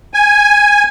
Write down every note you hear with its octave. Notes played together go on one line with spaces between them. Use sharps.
G#5